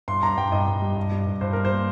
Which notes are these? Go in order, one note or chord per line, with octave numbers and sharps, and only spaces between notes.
G2 C6
G2 A#5
G2 G5
G2 D#5
G2
G3
G2
G3
G2
G2 C5
G3 A#4
C5
A#3